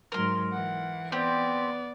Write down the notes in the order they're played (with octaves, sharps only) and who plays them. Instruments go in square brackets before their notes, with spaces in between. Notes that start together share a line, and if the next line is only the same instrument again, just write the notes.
[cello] G#2 F#3 [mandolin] A#4 C6
[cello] E3 [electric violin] F#5
[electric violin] B3 D5 [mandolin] C4 G4